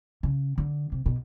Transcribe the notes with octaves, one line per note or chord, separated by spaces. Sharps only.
C#3
D3
C3
B2